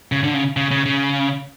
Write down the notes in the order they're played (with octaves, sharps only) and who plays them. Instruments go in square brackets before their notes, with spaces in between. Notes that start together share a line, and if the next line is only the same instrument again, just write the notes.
[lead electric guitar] C#3
D3
C#3
C#3
C#3
C#3